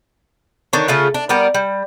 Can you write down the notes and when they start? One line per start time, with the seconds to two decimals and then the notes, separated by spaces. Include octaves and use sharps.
0.73 D3 D#3 D4 C#5
0.88 C#3 A3 F4 F#5
1.14 D4
1.29 G3 B3 A#4 D5
1.54 G3